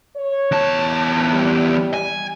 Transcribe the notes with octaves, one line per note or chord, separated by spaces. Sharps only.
C#5
E2 A5
G3
G#5